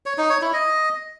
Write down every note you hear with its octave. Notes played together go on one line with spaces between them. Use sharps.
C#5
D#4
C#5
E4
D#5